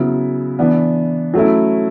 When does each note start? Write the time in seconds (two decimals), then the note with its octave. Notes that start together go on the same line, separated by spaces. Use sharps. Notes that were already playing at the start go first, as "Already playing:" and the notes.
Already playing: C#3 F#3 B3 E4
0.59 E3 B3 D4
1.34 F#3 A3 C#4 E4